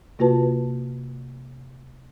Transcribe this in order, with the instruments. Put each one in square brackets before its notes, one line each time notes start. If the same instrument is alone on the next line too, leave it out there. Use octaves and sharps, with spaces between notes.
[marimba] C3 A#3 F4 F#4 B4 A5